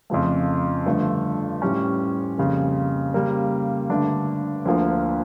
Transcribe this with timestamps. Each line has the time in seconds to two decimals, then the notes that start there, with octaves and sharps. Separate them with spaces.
0.10 F2 C#3 F3 A3
0.86 G2 D3 F3 A3
1.62 A2 G3 C#4
2.38 F2 C#3 G3 A#3
3.14 C#3 G3 A#3
3.89 G2 D3 A3 D4
4.65 D2 D3 F3 A#3